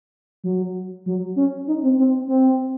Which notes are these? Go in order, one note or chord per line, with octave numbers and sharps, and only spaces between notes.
F#3
F#3
C#4
D#4
C4
C4
C4